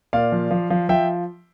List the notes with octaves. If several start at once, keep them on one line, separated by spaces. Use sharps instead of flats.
A#2 D5 F5
F3
F3
F3
F3 E5 G5